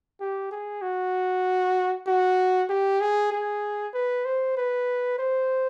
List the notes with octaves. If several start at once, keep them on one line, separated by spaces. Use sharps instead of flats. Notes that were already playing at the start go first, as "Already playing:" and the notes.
G4
G#4
F#4
F#4
G4
G#4
G#4
B4
C5
B4
C5